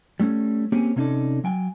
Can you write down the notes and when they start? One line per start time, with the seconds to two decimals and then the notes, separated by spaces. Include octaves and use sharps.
0.20 G3 A3 A#3 C#4
0.72 A#3 C4 C#4 G4 G#4
0.96 C3 B3 C#4 D#4 A4 D5
1.44 F#3 G5 G#5